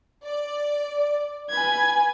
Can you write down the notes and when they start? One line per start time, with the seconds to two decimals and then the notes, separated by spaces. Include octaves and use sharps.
0.24 D5
1.50 B4 G#5 G#6